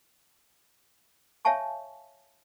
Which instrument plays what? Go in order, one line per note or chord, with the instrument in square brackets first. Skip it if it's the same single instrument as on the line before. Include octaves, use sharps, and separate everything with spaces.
[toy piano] C#5 E5 F5 G#5 A5 C#6